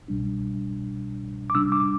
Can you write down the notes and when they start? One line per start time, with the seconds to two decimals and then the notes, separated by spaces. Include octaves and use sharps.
0.08 C2 B2 G3 D4
1.50 D6
1.54 C3 G3 D4 E6
1.72 D6